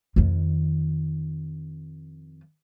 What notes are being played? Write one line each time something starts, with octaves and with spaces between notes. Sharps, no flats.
F2 D#3